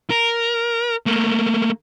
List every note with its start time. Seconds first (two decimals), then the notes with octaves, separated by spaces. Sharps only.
0.10 A#4
1.06 A3 A#3